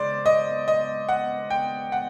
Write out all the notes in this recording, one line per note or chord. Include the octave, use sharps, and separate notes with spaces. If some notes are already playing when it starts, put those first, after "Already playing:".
Already playing: C#3 G#3 C5 D5
D#5
D#5
F#5
G5
F#5